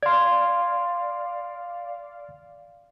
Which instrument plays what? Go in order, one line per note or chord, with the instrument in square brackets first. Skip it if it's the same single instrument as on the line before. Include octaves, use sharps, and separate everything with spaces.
[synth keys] D5 F5 [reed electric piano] C6 G#6